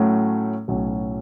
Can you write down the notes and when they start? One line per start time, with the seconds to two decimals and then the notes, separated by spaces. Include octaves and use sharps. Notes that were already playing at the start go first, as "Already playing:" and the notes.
Already playing: A2 F#3 A3 C#4
0.68 B1 A2 F#3 C#4